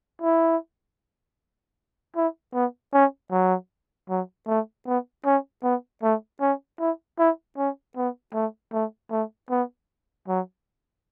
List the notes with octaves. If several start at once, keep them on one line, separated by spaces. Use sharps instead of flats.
E4
E4
B3
C#4
F#3
F#3
A3
B3
C#4
B3
A3
C#4
E4
E4
C#4
B3
A3
A3
A3
B3
F#3